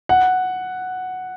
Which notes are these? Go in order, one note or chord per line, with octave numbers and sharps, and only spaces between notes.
F#5